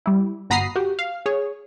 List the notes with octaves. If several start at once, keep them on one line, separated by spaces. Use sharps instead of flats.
G3 E4
G1 F#4 A#5 B5 D#6 C7
F#4 G4
F5
G#4 C#5